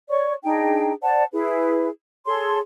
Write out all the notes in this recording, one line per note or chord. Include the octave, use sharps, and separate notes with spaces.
C#5 D5 C#6
D4 D#4 G#4 G5
C5 D5 F#5 A5
E4 G#4 B4
G#4 A4 C#5 C6